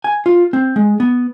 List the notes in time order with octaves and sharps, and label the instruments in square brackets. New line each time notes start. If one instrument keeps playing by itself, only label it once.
[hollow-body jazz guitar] G#5
F4
C4
G#3
B3